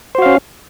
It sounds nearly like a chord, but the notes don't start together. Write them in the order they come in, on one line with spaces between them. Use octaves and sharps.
C5 F#4 F5 C#4